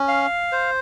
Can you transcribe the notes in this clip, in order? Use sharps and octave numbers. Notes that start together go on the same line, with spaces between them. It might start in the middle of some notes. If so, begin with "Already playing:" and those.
Already playing: C#4
F5
C5